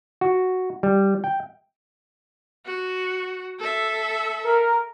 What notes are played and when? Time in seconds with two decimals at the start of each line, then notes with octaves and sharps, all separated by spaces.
0.21 F#4
0.83 G3
1.24 G5
2.65 F#4
3.59 A4 E5
4.45 A#4